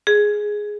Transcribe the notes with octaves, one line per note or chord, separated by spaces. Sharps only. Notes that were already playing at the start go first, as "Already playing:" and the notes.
G#4